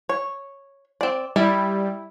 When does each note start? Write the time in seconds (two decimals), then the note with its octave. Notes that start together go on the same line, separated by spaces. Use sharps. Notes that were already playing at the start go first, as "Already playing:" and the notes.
0.09 C#5
1.01 C4 D5
1.36 G3 E4